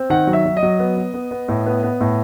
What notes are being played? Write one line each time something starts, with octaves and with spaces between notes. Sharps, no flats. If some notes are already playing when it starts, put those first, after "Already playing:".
Already playing: C4
D#3 F#5
F#3
E5
F#3
D#5
F#3
B3
B3
B3
B3
A2
B3
B3
A2